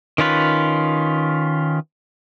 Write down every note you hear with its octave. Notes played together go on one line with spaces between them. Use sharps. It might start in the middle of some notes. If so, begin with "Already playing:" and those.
D#3 C#4 F4 B4